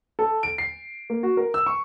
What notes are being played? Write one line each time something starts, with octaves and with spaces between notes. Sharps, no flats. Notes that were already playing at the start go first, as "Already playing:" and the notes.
A4
D7
C7
A#3
F#4
A#4
E6
C#6